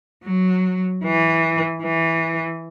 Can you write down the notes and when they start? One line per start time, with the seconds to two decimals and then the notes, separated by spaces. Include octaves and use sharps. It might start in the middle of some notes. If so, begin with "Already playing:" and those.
0.24 F#3
1.04 E3
1.83 E3